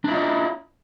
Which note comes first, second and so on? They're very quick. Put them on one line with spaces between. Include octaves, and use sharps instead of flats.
D4 E4 F4 D#5